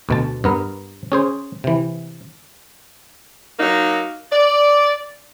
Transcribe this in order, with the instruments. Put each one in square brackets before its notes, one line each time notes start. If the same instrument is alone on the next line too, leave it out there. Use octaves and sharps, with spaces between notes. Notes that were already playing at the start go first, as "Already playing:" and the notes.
[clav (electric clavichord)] D2 B2 A5
G2 B3 A#4
C#4 G#4 C5
C3 E3
[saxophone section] F#3 A#3 D#4
D5